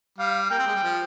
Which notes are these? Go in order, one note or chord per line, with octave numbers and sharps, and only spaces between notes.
G3 F5
A#3 G5
C4
G#3
G3
F3